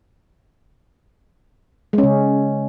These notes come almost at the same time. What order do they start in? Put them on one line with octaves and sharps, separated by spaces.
G#3 C#4 C#3